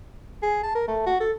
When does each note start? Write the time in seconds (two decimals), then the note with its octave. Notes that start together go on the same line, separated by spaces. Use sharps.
0.43 G#4
0.63 A5
0.75 A#4
0.88 A3
1.06 F#4
1.20 A4